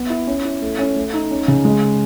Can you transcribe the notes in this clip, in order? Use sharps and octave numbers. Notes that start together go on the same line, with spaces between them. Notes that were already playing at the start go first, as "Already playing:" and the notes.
Already playing: B3
E4
C#4
E4
A3
C#4
A3
D#4
C#4
C#3
G#3